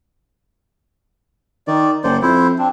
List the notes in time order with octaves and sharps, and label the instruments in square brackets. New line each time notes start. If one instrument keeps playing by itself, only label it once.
[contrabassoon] D#3 [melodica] D5
[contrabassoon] F#1 [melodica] C5 D5
[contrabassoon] F2 [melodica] E4 C5
[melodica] C4 D4